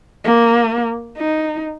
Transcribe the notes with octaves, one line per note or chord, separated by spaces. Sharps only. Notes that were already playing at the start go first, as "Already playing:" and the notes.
A#3
D#4